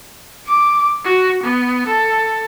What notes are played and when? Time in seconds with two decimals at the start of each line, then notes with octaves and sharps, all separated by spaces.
0.46 D6
1.05 F#4
1.43 B3
1.87 A4